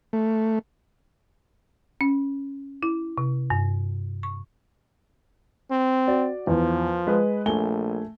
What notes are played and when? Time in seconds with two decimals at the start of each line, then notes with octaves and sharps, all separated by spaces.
0.13 A3
2.01 C#4
2.83 E4
3.18 C3
3.50 G2
4.23 C#6
5.71 C4
6.07 F#4 D5
6.47 E2 F3
7.07 G#3 B4
7.46 A#1 A3 G#5 G7